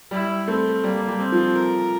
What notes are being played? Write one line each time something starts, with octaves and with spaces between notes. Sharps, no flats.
G3 E4
A3 C4
G3 A#3
G3
C4
F3
A#4